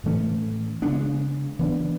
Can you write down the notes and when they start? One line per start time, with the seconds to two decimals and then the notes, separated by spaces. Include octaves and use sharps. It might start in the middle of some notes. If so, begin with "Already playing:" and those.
0.04 A2 E3 A3 C#4
0.82 C#3 G#3 B3 D4
1.59 E3 B3 D4